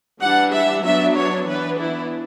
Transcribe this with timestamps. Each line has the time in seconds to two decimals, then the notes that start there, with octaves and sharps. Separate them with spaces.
0.20 E3 G3 D4 F#5
0.52 E5
0.83 F#3 B3 D4 E5
1.15 C#5
1.47 E3 B3 D4 B4
1.79 E4